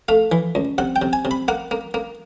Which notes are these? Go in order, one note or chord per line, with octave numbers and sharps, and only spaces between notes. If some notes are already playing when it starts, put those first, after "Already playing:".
A3 F5
E3
C#2
C3 F#5
G5
C3
G#5
C3
B5
A#3 F#5
A#3
A#3